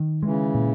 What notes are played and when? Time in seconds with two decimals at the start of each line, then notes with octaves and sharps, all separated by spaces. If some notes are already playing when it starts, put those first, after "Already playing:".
Already playing: D#3
0.23 C#3 E3 G#3
0.54 A#2